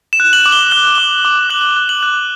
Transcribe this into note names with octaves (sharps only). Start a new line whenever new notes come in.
E7
F#6
F#7
D6
G7
F#6 G7
D6 G7
D6
F#6 F#7
F#6
F#7
F#6